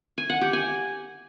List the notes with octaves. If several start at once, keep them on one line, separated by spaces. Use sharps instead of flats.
G#5
F#5
G4
G#5